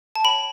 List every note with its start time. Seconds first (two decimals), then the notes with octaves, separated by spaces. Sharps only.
0.15 A5
0.24 C#5 G5 B5